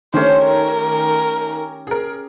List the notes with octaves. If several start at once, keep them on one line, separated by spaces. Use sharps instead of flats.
D#3 A3 C#4 G4 C5
A#4
G#4 A#4